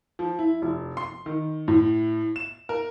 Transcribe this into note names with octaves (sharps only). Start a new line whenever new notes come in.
F3
E4
F1
C6
D#3
A2
E7
A#4